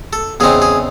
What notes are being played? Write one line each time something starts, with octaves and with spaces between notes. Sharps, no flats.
A4
E2 C#3 E3 C4 D#4 G#4
G#4